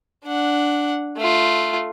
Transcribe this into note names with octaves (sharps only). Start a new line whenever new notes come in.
D4 F#5
A3 F4